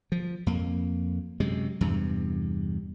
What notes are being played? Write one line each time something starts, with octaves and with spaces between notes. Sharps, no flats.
F3
F2 A#3
F#2 C3 G#3
E2 G2 C3